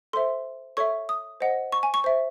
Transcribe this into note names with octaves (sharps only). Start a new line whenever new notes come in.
A4 C5 E5 C6
A4 C#5 E5 C#6
D#6
C5 D#5 F#5
C#6
G#5
C#6
C5 E5